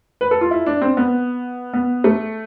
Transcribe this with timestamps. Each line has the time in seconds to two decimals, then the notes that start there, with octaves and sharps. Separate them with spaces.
0.21 B4
0.31 A4
0.41 F4
0.51 E4
0.66 D4
0.82 C4
0.97 B3
1.73 B3
2.04 A3